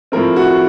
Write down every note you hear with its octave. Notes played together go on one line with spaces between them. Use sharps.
A2 F3 C4 A#4
F#4